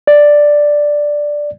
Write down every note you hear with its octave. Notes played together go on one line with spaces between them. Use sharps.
D5